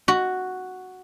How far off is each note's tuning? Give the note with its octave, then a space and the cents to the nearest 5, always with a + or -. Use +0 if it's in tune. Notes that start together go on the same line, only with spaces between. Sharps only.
F#4 +0